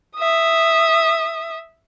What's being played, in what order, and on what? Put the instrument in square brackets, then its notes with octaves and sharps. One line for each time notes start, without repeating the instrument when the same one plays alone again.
[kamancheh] E5 D#6